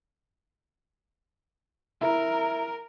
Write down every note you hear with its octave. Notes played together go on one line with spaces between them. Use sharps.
E4 A#4